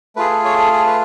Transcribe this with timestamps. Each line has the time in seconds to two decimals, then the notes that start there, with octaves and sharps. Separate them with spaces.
0.16 A3 F4 G#4 B4
0.30 A4
0.45 C#5
0.59 A4
0.73 G#4
0.87 B4